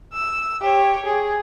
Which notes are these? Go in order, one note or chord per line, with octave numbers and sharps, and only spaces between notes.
E6
G4 C#5
G#4